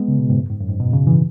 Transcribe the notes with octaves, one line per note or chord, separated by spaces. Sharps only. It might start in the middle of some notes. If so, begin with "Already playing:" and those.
Already playing: G#3 B3
C#3
B2
G#2
F#2
G#2
F#2
G#2
B2
C#3
E3